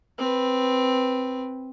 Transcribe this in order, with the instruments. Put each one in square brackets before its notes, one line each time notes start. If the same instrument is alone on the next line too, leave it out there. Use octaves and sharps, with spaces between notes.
[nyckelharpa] C4 B4